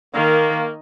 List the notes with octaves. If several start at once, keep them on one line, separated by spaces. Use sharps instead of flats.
D#3 A#3